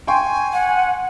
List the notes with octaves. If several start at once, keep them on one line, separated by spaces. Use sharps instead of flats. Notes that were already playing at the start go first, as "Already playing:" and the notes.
G5 G#5 C6 C#6
F#5